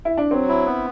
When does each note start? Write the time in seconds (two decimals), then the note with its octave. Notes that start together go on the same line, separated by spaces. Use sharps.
0.05 E4
0.18 D4
0.30 F#3 C4
0.48 E4
0.66 B3